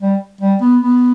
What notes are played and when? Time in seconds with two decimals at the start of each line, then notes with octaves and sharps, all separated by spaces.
0.01 G3
0.41 G3
0.61 B3
0.81 B3